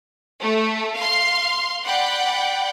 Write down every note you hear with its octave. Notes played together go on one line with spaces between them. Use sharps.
A3
F5 C6
D5 F#5 G5 B5 F#6 G6